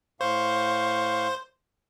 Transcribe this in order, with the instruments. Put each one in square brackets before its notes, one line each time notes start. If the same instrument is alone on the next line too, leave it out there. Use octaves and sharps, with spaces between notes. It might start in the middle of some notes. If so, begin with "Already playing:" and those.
[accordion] A2 F5 C#6 [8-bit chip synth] C5